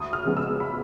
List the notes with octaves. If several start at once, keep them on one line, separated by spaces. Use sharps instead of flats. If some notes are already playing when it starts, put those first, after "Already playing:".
Already playing: D2 D#6
F6
C#3 F3 G#3 B3
E6
B5